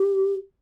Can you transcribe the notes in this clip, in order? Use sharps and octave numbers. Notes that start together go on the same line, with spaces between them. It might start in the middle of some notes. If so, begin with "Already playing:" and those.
Already playing: G4